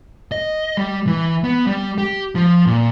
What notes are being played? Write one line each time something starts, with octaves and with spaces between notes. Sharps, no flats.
D#5
G3
E3
B3
G3
G4
F3
A#2